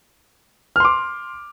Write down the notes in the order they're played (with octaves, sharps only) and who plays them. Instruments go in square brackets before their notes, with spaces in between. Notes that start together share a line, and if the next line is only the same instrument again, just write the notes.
[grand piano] F6
C6
D6